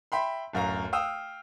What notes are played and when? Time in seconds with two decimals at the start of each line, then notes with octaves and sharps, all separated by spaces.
0.12 E5 G5 B5 C6
0.53 D1 F#2 F5 A#5
0.93 F5 G5 D#6 E6